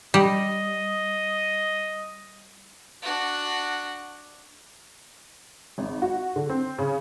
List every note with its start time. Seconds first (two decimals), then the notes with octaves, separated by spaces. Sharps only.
0.14 G3 D#5
3.02 D4 F#4
5.78 G#1
6.02 F#4
6.36 D3
6.50 C4
6.78 C#3